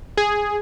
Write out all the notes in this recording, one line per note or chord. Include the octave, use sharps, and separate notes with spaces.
G#4